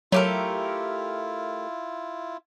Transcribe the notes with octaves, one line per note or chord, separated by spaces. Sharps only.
F#3 A3 E4 F4 G4 A#4